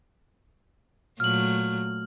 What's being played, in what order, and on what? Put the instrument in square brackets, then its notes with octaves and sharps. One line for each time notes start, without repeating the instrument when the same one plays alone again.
[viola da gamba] A#2 F#3 A3 [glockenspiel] F6 F#7